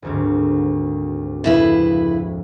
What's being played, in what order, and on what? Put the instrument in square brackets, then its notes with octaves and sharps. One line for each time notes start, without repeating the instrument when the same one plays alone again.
[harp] G#1 D2 G#2
[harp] F1 [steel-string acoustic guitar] C#3 E4 B4